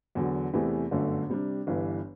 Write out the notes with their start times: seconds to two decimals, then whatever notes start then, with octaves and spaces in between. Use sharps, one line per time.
0.15 E2 D3 F#3
0.53 E2 C3 E3 A3
0.91 G1 F#2 D3 A3
1.30 C3 G3 D4
1.67 G1 G2 E3